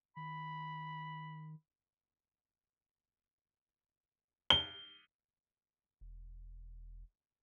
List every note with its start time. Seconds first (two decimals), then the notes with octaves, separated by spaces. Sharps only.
0.17 D#3 B5
4.50 G7
6.01 E1